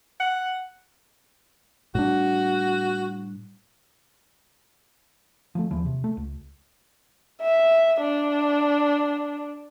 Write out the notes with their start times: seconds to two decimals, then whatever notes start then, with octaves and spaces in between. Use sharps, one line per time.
0.20 F#5
1.95 A2 G3 D4 F#4
5.55 F3 F#3 A3
5.71 D#2 E3 F3
5.86 C3
6.04 A3
6.17 C#2
7.42 E5
8.01 D4